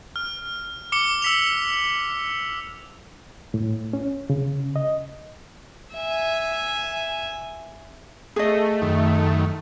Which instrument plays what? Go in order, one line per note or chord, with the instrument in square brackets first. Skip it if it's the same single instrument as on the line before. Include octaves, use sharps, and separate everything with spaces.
[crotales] F6
D6 C#7 G7
E6 B6 F7
[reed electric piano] A2
C#4
C#3
D#5
[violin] E5 G#5
[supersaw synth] A3 [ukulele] G#4 D#5
[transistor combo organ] F#2 D#3